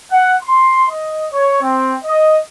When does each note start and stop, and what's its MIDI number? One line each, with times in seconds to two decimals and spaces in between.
0.11 0.34 78
0.43 0.85 84
0.89 1.25 75
1.32 1.61 73
1.62 1.95 60
2.04 2.38 75